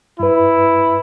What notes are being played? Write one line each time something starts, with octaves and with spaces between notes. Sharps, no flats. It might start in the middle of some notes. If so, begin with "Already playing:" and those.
G2 E4 B4